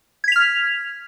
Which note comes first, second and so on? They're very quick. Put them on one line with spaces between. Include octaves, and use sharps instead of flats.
G#6 B6 F7 F6